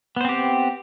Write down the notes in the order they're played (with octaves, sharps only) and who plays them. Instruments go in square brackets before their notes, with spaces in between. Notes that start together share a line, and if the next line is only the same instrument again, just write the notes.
[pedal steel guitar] B3
C5
C4
G4